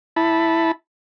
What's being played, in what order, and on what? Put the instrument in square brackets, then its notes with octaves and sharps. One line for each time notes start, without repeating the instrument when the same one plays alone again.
[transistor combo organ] E4 A5 B5